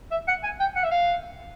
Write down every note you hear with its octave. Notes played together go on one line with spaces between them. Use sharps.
E5
F#5
G#5
G5
F#5
E5
F5